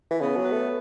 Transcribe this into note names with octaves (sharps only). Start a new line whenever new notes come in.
E3
C#3 B3
F#3
B4
A3